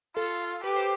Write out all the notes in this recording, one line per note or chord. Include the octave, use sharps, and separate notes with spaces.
F4 A4
G4 B4
C5